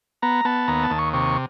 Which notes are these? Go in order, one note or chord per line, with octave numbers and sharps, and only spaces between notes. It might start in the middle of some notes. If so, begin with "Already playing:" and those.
B3 A#5
B3 A5
D#2 A#5
A5
D#2
C#6
C3 C#6